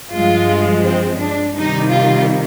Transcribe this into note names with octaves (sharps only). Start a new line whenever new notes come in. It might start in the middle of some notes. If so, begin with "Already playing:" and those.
G2 F3 G#3 F4
C4
D4
C3 D#3 G3 D#4
F4